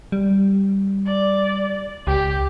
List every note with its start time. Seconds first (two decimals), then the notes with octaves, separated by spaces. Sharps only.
0.12 G3
1.06 D5
2.07 C#2 G4